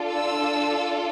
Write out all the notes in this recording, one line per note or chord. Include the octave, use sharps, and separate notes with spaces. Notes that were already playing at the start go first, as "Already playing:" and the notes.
Already playing: D4 F4 A4
E6